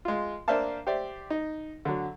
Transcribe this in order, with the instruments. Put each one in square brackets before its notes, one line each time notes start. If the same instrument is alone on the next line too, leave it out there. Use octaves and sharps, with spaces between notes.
[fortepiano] G#3 F4
A#3 D4 C5 E5 F5 A5
G4 C5 D5 E5
D#4
D3 F#3